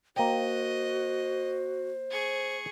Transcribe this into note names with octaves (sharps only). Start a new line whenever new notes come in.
A#3 F#4 C5 D#5 G5
G#4 C#6